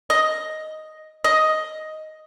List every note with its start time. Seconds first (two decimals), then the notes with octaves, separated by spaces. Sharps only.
0.10 D#5
1.24 D#5